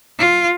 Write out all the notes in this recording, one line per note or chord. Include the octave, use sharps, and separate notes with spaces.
F4